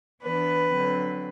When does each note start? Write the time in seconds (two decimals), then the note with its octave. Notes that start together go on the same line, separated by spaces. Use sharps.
0.23 E3 B3 D4 B4
0.71 D3 F#3 C4